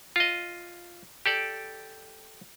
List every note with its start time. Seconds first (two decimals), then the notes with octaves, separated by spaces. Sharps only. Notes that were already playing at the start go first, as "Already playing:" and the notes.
0.16 F4 D#5
1.26 G4 A4 D5